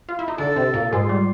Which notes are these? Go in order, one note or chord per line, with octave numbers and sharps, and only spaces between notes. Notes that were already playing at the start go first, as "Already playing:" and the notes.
F4
E4
D#4
D3 D4 A4
C3 C4
A#2 A#3
G#2 G#3 F4
G3